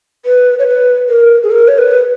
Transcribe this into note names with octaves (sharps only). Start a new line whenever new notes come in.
B4
C#5
B4
A#4
G#4
A#4
C#5
B4